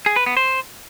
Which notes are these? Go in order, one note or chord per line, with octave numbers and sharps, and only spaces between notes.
G#4
B4
B3
C5